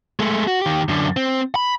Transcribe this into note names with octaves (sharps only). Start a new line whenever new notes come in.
G#3 A3
F#4
D#3 G4
F#2 D3
C4
B5